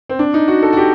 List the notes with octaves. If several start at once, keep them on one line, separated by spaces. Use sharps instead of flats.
C4
D4
D#4
F#4
A4
F#4
G4